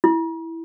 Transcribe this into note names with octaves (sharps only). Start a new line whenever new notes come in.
E4